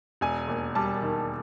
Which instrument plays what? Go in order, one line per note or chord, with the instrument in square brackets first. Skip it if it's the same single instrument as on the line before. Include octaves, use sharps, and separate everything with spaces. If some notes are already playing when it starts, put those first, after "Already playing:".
[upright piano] E1 G#5
D#2
G3 A5
D#3